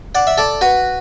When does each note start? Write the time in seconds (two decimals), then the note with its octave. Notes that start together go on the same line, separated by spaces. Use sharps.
0.15 D5 F#5
0.27 E5
0.38 A4 D5
0.61 F#4 B4